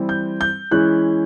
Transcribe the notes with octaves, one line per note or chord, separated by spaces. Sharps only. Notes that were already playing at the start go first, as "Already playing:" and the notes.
Already playing: E3 G3 C4 E4
G6
G6
E3 G#3 C#4 E4 F#6